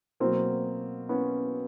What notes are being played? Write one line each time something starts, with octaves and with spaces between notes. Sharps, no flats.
B2 F#3 A#3 C4
B3 C#4